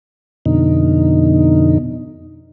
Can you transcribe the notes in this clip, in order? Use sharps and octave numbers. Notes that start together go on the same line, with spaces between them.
F2 B2 D3 D#4